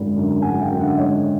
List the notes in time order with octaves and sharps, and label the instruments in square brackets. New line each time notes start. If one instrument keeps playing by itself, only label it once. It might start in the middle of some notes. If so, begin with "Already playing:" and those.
Already playing: [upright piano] G#1 F#2 D3
F#2 D3
G#1 F#5 G#5
F5 G5
F#2 D3
E5 F#5
G#1 C#5 D#5